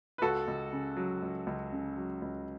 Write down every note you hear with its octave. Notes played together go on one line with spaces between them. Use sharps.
B4
C#2 F#4 A4
C#2
C#3
F#3
C#2
C#2
C#3
F#3
C#2